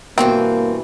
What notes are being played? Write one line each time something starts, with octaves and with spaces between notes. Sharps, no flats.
G2 B2 E3 A#3 C4